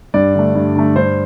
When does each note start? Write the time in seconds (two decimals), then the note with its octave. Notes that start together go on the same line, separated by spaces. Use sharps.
0.14 G2 D5
0.35 D3 A3
0.55 G2
0.76 D3 A3
0.96 G2 C5